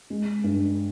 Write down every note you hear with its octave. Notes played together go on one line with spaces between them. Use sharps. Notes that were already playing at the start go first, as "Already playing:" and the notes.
G#3
G2